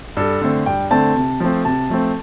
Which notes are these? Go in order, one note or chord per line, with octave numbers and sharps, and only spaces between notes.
G2 A4
D3 A3 C4
G2 G5
D3 A3 C4 A5
C3
F3 A3 C4
C3 A5
F3 A3 C4